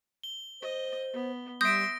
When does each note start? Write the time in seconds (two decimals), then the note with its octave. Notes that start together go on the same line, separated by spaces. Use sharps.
0.23 G7
0.62 C5 D#5
1.13 B3
1.61 G3 E5 C6 D#6 G6 A#6 D7